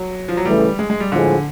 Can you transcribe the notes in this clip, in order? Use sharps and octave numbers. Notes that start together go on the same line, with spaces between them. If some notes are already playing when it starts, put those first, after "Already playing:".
Already playing: F#3
F3
F#3
C#3 E3 G3 A3
G#3
G#3
G3
A2 D3 F3 G#3